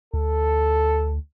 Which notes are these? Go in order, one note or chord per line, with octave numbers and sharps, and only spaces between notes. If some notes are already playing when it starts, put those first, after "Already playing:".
D2 A4